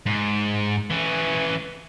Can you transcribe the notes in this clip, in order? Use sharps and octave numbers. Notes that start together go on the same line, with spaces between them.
G#2
E3 C#4